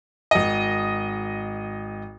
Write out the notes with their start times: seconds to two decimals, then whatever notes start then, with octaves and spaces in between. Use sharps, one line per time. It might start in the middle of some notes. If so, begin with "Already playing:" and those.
0.31 G#1 D#5